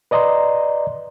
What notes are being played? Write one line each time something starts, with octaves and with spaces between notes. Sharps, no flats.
B4 D5 D#5 A#5 C6